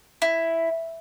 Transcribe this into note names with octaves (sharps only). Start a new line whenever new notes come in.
E4